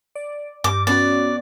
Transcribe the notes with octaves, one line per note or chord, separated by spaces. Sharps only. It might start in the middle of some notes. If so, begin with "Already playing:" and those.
D5
G2 D6
B3 C#4 F#4 D5